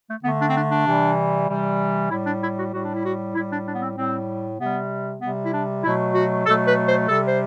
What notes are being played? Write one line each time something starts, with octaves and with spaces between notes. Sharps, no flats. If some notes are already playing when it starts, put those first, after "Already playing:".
A3
D3 A3 B3
D4
C4
D4
D4
C3 E3 G3
C3 E3 G3
A2 G3 E4
D4
E4
F#4
A2 G3 F#4
D4
E4
F#4
A2 G3 E4
D4
D4
B3
C4
A2 G3 C4
C3 G3 B3
C3 G3 B3
E4
D4
B2 F#3 A3 E4
F#4
B2 F#3 A3 A4
B4
C5
C3 G3 A4
C5